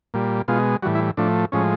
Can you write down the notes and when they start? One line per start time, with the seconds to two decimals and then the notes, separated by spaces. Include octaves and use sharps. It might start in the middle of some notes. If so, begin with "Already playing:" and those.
0.14 A#2 G3
0.48 B2 G#3 F4
0.83 A2 E3 G3 F#4
0.95 E4
1.17 A2 F3 A3 D4
1.52 A2 F3 G#3 C#4